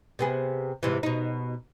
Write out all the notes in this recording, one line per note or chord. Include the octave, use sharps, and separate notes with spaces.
C3 B3 G#4
G#2 C3 E3
B2 D#4